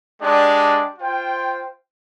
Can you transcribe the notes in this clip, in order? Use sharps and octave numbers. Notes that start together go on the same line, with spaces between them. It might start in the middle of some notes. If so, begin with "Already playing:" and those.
G#3 D4 G4 D5
F4 C5 G5